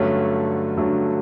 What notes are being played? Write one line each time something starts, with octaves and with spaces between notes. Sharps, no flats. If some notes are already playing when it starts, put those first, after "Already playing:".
Already playing: G2 D3 F#3 A3 C#4
G2 D3 F#3 A3 C#4